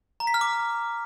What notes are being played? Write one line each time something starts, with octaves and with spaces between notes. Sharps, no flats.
A#5
B6
F6
D6